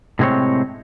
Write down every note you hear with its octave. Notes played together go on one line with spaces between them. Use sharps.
A2 C3 G#3 A#3 C4 C#5